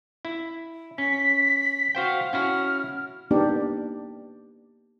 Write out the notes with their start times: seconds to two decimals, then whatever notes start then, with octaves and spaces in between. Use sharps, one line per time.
0.25 E4
0.98 C#4 B6
1.95 F#4 C5 F5 G5
2.33 C#4 E4 F#4 F6
3.31 A#3 B3 D4 D#4 G4